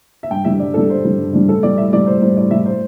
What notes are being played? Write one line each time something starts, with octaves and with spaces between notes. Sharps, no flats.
E5
G2 G5
D3 G3 E5
G2 D5
D3 G3 A4
G2 C5
D3 G3
G2
D3 G3
A2 A4
G3 D5
A2 E5
G3 D5
A2 C5
G3 C5
A2 D5
G3 E5
A2 C5